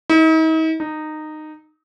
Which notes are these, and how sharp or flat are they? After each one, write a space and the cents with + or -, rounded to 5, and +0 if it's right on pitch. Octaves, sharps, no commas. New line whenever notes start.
D#4 +45
D#4 -15